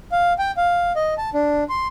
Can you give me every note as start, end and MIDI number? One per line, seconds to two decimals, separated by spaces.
0.12 0.33 77
0.39 0.51 79
0.57 0.92 77
0.96 1.14 75
1.18 1.30 81
1.34 1.64 62
1.69 1.87 84